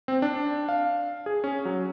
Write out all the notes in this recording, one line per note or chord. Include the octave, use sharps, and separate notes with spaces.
C4
D4
F5
G#4
C#4
F#3